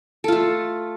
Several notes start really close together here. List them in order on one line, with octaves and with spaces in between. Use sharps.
A4 F4 A3